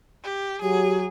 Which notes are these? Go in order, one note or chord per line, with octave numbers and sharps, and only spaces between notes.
G4
F#3 G4 G#4